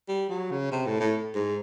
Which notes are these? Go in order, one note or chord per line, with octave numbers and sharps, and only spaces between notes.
G3
F#3
C#3
C3
A2
A2
G#2